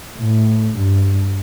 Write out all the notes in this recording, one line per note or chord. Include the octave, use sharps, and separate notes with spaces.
A2
G2